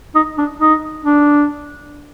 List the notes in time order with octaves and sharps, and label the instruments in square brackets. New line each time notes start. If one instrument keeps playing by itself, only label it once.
[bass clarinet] D#4
D4
D#4
D4